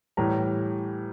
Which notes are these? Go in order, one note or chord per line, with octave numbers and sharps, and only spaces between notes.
A2 E3 G3 A#5